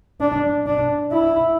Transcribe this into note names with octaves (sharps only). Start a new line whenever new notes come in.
D4
D4
E4